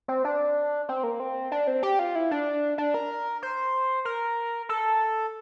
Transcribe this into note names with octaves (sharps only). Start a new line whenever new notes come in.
C4
D4
C4
A#3
C4
D4
C4
G4
F4
E4
D4
D4
A#4
C5
A#4
A4